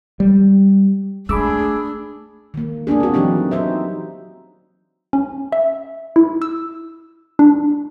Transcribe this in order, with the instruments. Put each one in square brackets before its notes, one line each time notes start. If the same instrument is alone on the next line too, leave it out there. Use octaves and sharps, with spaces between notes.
[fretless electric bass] G3
[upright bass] A3 [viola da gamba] D4 [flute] G#4 [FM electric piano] B5 D6 E6
[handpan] D#3 A#3
A#3 B3 D4 G#4
C4 F#4
E3 F#3 C4 D#4 G4
D#4 C5 E5
[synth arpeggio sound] C#4
E5
E4
E6
D4